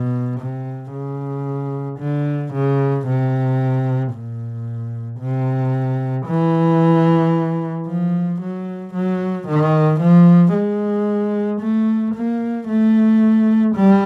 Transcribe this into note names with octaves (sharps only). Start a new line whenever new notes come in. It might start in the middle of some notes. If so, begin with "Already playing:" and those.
Already playing: B2
C3
C#3
D3
C#3
C3
A#2
C3
E3
F3
F#3
F#3
D#3
F3
G#3
A3
A#3
A3
G3